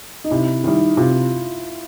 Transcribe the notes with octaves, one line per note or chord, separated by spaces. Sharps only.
D#4
C3 E4
D#3 G3 E4
C3 F4